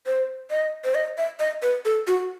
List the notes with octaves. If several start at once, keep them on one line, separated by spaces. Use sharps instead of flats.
C5
D#5
C5
D#5
E5
D#5
B4
A4
F#4